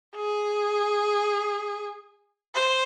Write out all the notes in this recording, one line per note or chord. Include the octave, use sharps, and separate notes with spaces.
G#4
C5